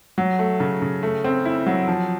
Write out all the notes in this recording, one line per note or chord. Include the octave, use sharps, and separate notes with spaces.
F#3
A3
C#3
C#3
A3
C4
E4
F#3
F3